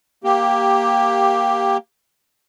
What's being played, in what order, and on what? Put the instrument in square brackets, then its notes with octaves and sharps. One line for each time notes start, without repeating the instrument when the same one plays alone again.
[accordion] A#3 G4